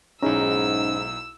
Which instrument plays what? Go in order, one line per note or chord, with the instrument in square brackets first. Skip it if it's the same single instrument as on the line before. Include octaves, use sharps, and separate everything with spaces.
[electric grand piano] B1 E4 A#5 [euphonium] G#2 [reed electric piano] C#4 D#4 G#4 [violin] E6